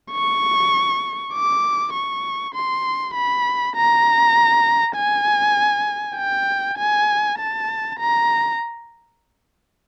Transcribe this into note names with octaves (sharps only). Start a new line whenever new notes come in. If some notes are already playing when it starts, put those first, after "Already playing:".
C#6
D6
C#6
C6
B5
A#5
G#5
G5
G#5
A5
A#5